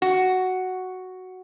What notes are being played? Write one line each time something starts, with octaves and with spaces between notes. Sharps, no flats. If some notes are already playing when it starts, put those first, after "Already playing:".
F#4